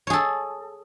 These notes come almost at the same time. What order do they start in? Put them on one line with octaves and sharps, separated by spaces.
C#5 G#4 A4